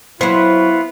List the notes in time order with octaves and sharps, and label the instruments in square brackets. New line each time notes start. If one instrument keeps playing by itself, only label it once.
[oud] F#3 C5 [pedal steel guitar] B3 F4 B4 [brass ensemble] E4